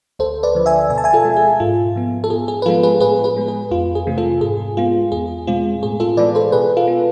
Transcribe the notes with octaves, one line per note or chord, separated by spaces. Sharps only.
D2 A4 C5
B4 D5
D3 F3
E5 G#5
B2 G#5
A5
E5 G#5
F4 A4
G#3 C4
G#4
G#2 F4
F3 B3
A4
G#2 G#4
G#4
B4
F3 G#3 B3 F4 A4
G#4 B4
A2 G#4 B4
G#4 B4
G#3 B3
G#4
F2 F4
G#4
C3 E3 A3 C4
F4 A4
G#2 G#4
G#3 B3 F4
E2 G#4
B2 G#3 C4 F4
A2 G#4
F4 A4
E3 G#3 B3 B4 D5
A4 C5
B2 G#4 B4
F4 A4
B3